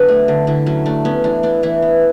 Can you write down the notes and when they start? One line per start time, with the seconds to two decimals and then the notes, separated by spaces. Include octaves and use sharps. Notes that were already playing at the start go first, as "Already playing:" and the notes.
Already playing: D3 F#3 B3 D4 B4
0.08 A3
0.28 D3
0.47 D3 E4
0.67 F#3 C#4
0.86 A3 D4
1.05 B3 C#4
1.24 E3 D4
1.43 B3 D4
1.63 E3 E4
1.82 B3